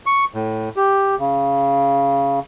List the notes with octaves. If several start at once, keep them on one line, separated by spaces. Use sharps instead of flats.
C#6
A2
G4
C#3